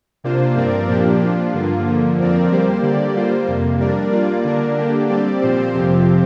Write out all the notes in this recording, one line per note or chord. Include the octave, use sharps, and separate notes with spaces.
C3 A#3 D4 F4 C5
G2 F3 C4 A#4 D5
A#2 F3 A#3 D4 G4
F3 D4 F4
G2 D3 A#3 F4
D3 F3 A#3
F2 F3 C4 A#4 D5
G3 A#3 G4 C5
D3 A#3 G4 D5
G3 A#3 F4 C5
F2 C3 A#3
G3 D4 A#4 D5
G3 A#3 F4 D5
D3 A#3 D4 A#4
D3 A#3 D4 G4
G3 C4 G4 D5
A#2 F3 C4 G4 C5
F2 C3 F3 C4 G4